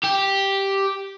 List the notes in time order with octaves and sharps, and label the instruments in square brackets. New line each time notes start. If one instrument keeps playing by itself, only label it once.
[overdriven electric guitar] G4